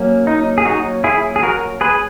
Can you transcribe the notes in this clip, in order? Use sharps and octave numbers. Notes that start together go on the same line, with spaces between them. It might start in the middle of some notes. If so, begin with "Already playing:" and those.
Already playing: F#3 A#3 C#4
D#4
G#4
D#4 F#4
E4 G#4
G#4
F#4 A#4
G#4 B4